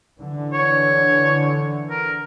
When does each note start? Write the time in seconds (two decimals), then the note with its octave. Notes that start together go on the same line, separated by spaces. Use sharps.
0.21 D3 E3
0.53 C#5
1.90 A#4